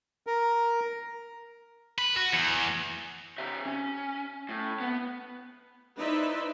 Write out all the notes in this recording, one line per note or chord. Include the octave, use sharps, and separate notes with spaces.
A#4
B4
F#4
E2
C#3 E5
C#4
A2
B3
D#4 E4 B4 C5 D5 E5